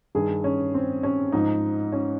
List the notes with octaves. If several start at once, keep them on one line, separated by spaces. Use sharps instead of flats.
G2 D#3 G#4
C#4
C4
C#4
G#2 F3 D#4
C#4